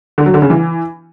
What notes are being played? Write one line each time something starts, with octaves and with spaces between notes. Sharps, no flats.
D3
F#3
D3
C#3
E3